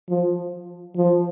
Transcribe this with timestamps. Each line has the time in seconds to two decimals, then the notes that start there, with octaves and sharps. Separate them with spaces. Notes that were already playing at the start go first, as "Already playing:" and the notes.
0.09 F3
0.96 F3